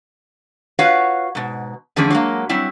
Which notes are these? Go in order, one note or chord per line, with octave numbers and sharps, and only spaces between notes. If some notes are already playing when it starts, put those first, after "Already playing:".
F4 F#4 B4 C#5 F5 F#5
G#2 B2
E2 D3 F3 A3 C#4 G#4
F#3 G#3 A#3
F#3 G3 C4 E4